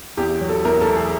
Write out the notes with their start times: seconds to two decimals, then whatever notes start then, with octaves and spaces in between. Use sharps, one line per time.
0.17 E2 G4
0.41 F#3
0.49 A4
0.65 E2 A#4
0.81 A4
0.88 A3
0.96 G#4